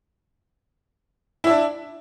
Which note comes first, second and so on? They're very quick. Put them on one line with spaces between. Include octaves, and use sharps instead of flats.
E4 E5 D4